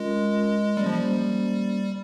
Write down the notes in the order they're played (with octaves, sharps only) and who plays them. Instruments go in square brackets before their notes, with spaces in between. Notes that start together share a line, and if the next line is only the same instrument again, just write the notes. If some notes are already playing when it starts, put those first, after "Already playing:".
Already playing: [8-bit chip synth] G#3 [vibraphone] C#4 F4 A#4 D#5
[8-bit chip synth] G3 [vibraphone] A#3 C#4 G4 C5
[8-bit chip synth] F3
G3